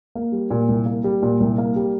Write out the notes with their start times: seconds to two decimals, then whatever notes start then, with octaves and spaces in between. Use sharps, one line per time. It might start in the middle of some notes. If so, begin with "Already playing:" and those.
0.15 A#3
0.32 G3
0.51 A#2
0.68 C2
0.86 A#3
1.04 G3
1.22 A#2
1.40 C2
1.58 A#3
1.76 G3